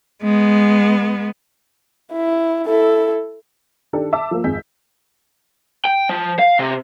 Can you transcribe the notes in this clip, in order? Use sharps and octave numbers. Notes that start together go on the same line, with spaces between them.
G#3 B3
E4
E4 A4
D#3 D4 G4 A4
E5 A5 D6 E6
F3 A#3
G#1 F2 G#4 G6 B6
G5
F3
F5
C3